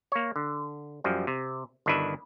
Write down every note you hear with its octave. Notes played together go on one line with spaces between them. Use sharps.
A#3 C#5
D3
F#2 F3 G3
C3
G1 D#3 D4 E4 B4 E5